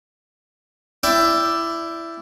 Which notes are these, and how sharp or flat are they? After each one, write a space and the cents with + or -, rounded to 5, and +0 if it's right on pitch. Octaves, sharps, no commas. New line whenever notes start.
E4 +15 D5 +0 G5 +0